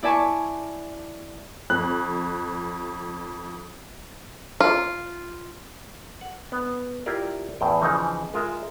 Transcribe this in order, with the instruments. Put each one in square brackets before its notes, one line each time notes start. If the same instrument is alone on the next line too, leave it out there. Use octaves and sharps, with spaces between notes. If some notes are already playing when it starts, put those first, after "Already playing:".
[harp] E4 D5 E5 G#5 A5 C#6
[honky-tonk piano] F2 [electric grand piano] F#6
[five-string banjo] F4
[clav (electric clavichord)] F#5
B3
E4 F4 G4 A#4 D5 F5
E2 A2 G5
C#3 E3 F3 D#4
G#3 F4 A#4 E5